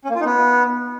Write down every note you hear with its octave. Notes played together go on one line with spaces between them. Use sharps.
C#4
A#3
F4
D#4
B3